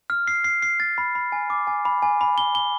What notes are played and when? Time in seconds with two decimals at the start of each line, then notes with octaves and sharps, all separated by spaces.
0.10 F6
0.27 C7
0.44 C7
0.62 C7
0.80 A6
0.98 B5
1.15 B5
1.32 G#5
1.50 D6
1.67 G#5
1.85 B5
2.02 G#5
2.21 B5
2.38 G7
2.55 G7